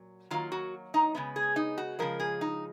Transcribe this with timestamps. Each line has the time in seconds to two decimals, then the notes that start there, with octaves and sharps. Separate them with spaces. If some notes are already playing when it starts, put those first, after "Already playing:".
Already playing: A#2 F#3
0.31 D#3 F#3 A#3 F4
0.52 F#4
0.94 D#4
1.15 C#3 G#3 B3
1.36 G#4
1.56 D#4
1.78 F#4
1.99 C#3 F3 G#3 A#4
2.20 G#4
2.41 D#4